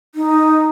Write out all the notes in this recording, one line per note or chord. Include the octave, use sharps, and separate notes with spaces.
D#4